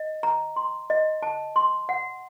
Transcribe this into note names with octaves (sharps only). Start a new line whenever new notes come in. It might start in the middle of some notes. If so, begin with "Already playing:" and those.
Already playing: D#5
A#5
C6
D#5
A5
C6
F#5